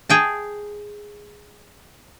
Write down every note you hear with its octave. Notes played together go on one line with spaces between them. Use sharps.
G#4 G5 A5